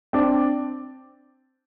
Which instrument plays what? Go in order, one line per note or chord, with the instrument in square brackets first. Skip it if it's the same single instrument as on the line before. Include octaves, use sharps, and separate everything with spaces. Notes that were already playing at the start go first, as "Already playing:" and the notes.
[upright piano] C4 D4